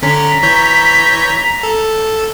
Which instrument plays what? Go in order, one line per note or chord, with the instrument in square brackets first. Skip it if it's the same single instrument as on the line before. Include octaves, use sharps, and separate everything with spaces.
[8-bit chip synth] D3 C#4 [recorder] A#5 [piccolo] B6
[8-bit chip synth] E3 C#5 G6
A4